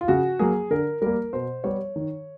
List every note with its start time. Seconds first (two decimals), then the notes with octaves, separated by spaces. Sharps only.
0.01 F4
0.08 C#3 F#4
0.39 F#3 A#3 G#4
0.71 D3 A#4
1.02 G3 A#3 A#4
1.33 B2 C5
1.64 G3 B3 C#5
1.96 D#3